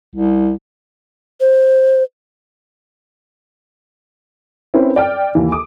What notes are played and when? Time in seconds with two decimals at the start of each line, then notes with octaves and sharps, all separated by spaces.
0.15 C2
1.41 C5
4.74 C4 C#4 E4 A#4 B4
4.96 D5 G5 F6
5.35 D#2 E3
5.52 D6 D#6